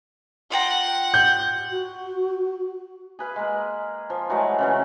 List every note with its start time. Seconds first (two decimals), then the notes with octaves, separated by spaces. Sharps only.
0.52 F4 F#5 G5 A#5
1.14 G6
1.71 F#4
3.19 G#4 B4 F5
3.36 G#3 A#3
4.10 F3
4.30 E3 F#3 G#3 A3
4.59 C#3 E3 C#4